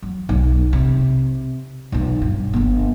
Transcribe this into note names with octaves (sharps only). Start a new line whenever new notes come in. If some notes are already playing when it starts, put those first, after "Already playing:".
F#3
B1 F#3
C3
B1 F4
G2
G1 B3